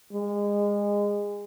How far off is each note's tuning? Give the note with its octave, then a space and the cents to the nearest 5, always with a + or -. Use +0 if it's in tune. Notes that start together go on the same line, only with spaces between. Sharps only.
G#3 -25